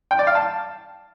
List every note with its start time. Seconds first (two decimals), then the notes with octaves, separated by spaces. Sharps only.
0.11 G5
0.19 D5
0.27 F5
0.35 A5